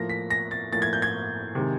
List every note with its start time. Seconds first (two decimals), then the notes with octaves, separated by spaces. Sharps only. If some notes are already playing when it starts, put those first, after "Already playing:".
Already playing: A2 F3 A#3 A#6
0.09 B6
0.30 A#6
0.51 A6
0.72 A2 F3 A#3 A6
0.82 G#6
0.93 G6
1.02 G#6
1.55 C3 D#3 G#3